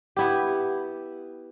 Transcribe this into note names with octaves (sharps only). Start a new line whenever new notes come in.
B3 E4 G4